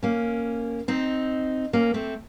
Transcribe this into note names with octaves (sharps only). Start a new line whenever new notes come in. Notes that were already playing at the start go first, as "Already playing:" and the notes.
A#3 C#4
C4 D#4
A#3 C#4
A3 C4